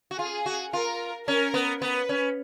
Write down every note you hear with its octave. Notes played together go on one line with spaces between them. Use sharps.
F#4
F4 G#4
F#4
F4 A#4
C#4 A#4
B3
B3 B4
C#4